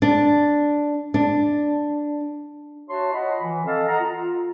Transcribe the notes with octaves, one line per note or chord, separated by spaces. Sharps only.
D4
D4
F#4 C#5 E5 A5 C6
F4 C#5 D#5 F#5 B5
E3
C4 A4 D#5 F5 A5
D#5 F#5 A#5
F4